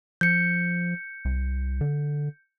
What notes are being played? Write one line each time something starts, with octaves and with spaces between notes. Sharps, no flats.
F3 G6 C#7
C2
D3